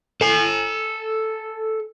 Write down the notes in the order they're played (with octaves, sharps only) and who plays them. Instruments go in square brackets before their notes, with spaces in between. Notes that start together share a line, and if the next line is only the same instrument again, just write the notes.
[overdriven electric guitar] A4 G#5